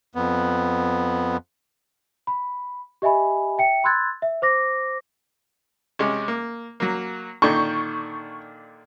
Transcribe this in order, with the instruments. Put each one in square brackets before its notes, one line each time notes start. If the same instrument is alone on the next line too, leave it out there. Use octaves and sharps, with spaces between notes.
[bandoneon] F2 B3
[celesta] B5
G4 D#5 E5 G#5 B5
E5 G5 C#7
B5 C6 E6 F#6 G#6 A6
E5
C5 D6 A#6
[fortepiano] C3 G#3 C#4
A#3
F#3 A#3
[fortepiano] A#2 D3 D#3 [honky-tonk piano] C#6 G6